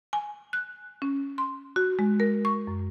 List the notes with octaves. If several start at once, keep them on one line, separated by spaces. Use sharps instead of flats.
G#5
F#6
C#4
C6
F#4
G#3
A#4
C#6
F#2